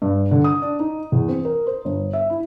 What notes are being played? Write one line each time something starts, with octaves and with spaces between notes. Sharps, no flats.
G2
D3
D#6
D4
D#4
E2
C4
A#4
C5
G1
E5
E4